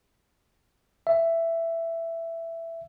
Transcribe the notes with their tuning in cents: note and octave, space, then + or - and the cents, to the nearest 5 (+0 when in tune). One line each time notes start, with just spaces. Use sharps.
E5 +10